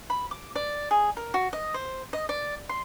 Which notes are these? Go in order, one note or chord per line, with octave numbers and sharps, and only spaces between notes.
B5
D6
D5
G#4
A#4
F#4
D#5
C5
D#5
D5
C6